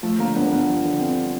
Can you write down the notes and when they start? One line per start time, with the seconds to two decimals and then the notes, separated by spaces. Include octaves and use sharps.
0.03 F3 A3
0.19 D3 A#3
0.36 G2 B3
0.52 G2 B3
0.68 F3
0.85 D3
0.99 G2 C4